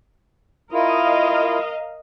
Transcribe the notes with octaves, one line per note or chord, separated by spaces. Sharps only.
E4 F4 A#4 D#5 F5